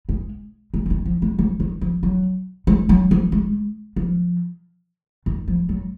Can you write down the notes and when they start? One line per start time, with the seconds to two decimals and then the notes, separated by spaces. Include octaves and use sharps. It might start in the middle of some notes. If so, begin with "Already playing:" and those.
0.09 G#3
0.74 G#3
0.86 F3
0.90 D#3
1.06 F3
1.22 G#3
1.39 F3
1.60 D#3
1.81 F3
2.03 F#3
2.67 G#3
2.89 F#3
3.11 F3
3.32 G#3
3.96 F3
5.26 D#3
5.48 F3
5.69 F#3